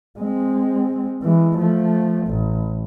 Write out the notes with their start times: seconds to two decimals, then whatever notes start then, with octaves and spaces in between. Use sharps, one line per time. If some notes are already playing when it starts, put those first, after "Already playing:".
0.19 G#3 C4
1.22 E3 G#3
1.58 F3 A3
2.27 A1